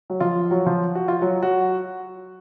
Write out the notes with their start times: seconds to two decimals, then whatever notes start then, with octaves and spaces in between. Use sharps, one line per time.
0.10 F#3 F#4
0.20 F3 F4
0.51 F#3 F#4
0.66 F3 F4
0.95 F#4
1.08 F4
1.21 F#3 F#4
1.43 F#3 F#4